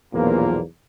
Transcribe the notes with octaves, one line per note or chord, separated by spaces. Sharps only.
B1 E2 A#2 F3 A#3